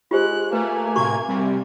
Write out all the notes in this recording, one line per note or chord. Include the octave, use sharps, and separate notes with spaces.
G#3 F4 G4 C5 F#6
A3 A#3 B4 G#5
A2 C3 F#4 C#6 G#6
C3 G3